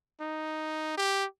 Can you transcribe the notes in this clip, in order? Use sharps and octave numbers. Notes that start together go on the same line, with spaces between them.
D#4
G4